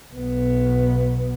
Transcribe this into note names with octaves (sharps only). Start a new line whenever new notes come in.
B1 B3